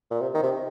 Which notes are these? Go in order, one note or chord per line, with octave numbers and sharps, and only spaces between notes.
A#2
C3
D#3
C3